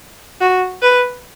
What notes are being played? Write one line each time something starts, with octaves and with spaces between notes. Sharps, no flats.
F#4
B4